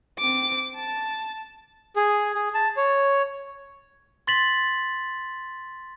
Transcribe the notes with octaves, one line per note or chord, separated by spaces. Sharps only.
C4 D6
A5
G#4
G#4
A5
C#5
C6 A6 B6 F#7